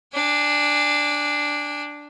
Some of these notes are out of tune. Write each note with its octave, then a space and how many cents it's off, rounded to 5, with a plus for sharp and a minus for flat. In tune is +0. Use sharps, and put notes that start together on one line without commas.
D4 +0 G#5 -35